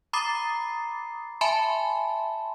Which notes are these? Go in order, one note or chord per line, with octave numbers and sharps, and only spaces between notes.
A#5 B5 D6 D#6 A6 C7
E5 G#5 A5 B5 C6